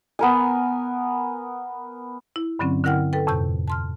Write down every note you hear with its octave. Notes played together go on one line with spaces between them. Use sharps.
B3 A#4 G#5
E4
G2 D3 F#3 C4 C#4
D3 E4 A#4 F#5 G5 F6
A4 B4 G5
F2 A2 C3 A5 G6
A5 C6 F6